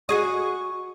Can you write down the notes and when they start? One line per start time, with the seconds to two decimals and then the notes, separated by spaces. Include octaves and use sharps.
0.09 F#4 G#4 D#5 C#6